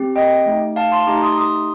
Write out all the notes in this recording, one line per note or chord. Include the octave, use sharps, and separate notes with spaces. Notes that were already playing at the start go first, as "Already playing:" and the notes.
Already playing: C4 G4
D#5 G5
A3 D#4 G4
F5 A5
A5 C6
A3 D#4 G4 A#5 D6
C6 D#6
C6 D#6